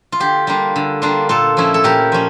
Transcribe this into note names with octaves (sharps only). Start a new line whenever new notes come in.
F4
D3 G4
G3 A#3 D4 F4
D3
G3 A#3 D4 F4
A#2 F4 A4
F3 C#4 E4
A4
A#2 G4 A#4
F3 C#4